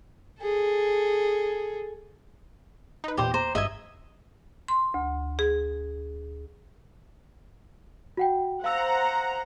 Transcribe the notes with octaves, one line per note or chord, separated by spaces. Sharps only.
G#4 A4
D#4 B4
E2 A#2 G4 C5
C5 A#5
G#1 G2 D#5 E5 G#6
C6
D2
G#4
F#4 F#5 G5
C5 F5 F#5 A#5 E6